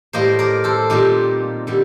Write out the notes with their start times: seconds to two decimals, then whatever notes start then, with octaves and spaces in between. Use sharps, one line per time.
0.13 A2 G3 A#3 C5 D#5
0.39 A#4 D5
0.64 A4 C5
0.90 A#2 G3 C4 D#4 G4
1.67 D3 G3